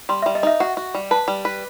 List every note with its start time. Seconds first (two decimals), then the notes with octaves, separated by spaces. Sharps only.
0.09 G3 C6
0.22 G3 E5
0.35 D#5
0.43 D#4 E5
0.60 F#4 F#5
0.77 F#4
0.94 G3
1.11 B4 A5
1.28 G3
1.45 B4